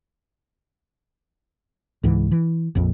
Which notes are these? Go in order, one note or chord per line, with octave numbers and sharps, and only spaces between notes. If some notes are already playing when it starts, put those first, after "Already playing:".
C#2 G#2 E3
E3
A#1 F2 A#2